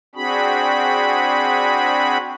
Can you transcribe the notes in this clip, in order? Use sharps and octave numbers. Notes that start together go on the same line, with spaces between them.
C4 D4 F#4 G#4 B5